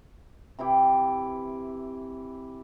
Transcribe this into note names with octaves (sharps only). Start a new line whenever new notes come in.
C3 E3 E4 G4